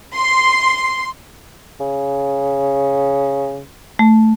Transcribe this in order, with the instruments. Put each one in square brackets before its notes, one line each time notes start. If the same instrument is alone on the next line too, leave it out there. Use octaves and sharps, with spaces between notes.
[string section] C6
[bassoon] C#3
[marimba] A3